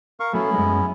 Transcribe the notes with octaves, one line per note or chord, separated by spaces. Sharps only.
A#4 F5 C#6
F#3 A3 B3 C#4 E4
F#2 G#3